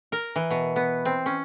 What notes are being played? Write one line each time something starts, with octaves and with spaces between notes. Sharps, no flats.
A#4
E3
B2
B3
C4
C#4